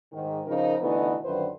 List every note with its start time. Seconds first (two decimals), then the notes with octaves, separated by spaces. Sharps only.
0.13 G#2 D#3
0.46 C#3 F3 D#4 A#4
0.80 B2 D3 E3 A3 B3 D#4
1.24 F#2 D3 D#3 F3 B4 C5